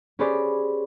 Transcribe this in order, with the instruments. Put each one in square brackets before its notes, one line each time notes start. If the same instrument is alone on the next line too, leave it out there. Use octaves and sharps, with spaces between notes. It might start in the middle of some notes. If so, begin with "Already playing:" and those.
[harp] C#4 G4 G#4 B4 C5 D5